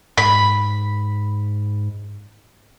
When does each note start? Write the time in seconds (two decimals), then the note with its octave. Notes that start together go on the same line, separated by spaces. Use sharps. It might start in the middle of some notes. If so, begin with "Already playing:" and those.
0.18 G#2 B5